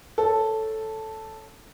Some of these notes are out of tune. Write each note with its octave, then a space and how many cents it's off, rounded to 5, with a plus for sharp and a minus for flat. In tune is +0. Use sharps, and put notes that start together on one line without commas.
A4 +0 C#5 +0